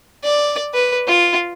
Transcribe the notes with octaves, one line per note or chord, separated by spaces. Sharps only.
D5
B4
F4